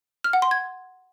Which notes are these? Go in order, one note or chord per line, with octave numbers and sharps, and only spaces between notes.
F6
F#5
C6
G#6